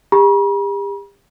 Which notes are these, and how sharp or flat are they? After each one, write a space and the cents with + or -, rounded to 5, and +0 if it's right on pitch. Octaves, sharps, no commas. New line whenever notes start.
G4 +40 B5 -45